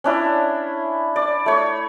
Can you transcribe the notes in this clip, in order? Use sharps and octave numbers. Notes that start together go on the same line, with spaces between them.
C#4 D4 E4
D5
A3 C#5